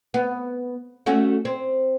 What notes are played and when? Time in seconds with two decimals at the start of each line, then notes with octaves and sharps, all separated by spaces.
0.14 B3
1.06 A3 C#4 F#4
1.45 C4